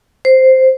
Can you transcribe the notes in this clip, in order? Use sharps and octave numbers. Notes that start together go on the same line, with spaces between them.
C5